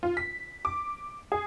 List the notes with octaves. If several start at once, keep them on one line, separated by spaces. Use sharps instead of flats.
F4
B6
D6
G#4